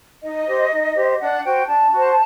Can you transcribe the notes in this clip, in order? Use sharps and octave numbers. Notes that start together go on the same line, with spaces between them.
D#4 D#5
G4 C5
D#4
G4 C5
D4 F#5
F#4 C5 G5
D4 A5
F#4 C5